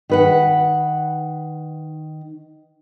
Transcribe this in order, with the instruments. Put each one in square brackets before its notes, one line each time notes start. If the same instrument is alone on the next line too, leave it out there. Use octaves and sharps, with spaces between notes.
[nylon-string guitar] D#3 B4 F#5